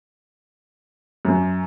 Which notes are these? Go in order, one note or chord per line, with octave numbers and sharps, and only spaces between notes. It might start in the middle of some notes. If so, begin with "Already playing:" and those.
F#2